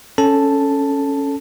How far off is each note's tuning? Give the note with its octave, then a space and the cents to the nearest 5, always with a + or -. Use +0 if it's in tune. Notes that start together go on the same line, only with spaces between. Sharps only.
C#4 +0 A4 +0 A5 +0